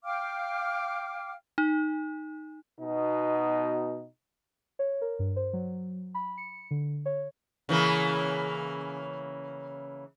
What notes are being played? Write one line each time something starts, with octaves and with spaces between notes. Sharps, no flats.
F5 G5 D6 F6
D#4
B2 D#4
C#5
A#4
G2
C5
F#3
B5
C#7
D3
C#5
C#3 E3 A#3